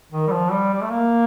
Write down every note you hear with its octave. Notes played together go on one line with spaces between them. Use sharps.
D#3
G3
F3
G3
G3
A3
A#3